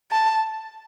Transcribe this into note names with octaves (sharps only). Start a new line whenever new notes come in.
A5